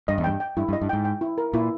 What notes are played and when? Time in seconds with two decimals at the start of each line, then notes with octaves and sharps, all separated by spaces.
0.08 G2 D#5
0.18 E2
0.24 G2 G5
0.40 G5
0.57 G2 E4
0.69 G2
0.73 D#5
0.82 G2
0.89 G#2 G5
1.05 G5
1.21 E4
1.38 A#4
1.53 A#2 E4